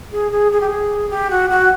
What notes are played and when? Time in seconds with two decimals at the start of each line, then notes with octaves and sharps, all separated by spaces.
0.11 G#4
0.31 G#4
0.51 G#4
0.60 G4
0.69 G#4
1.10 G4
1.30 F#4
1.49 F#4